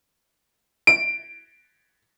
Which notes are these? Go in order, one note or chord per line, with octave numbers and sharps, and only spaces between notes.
D7